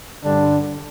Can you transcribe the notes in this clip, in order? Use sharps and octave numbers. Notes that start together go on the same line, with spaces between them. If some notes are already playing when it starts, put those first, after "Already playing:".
G2 D3 G3 D4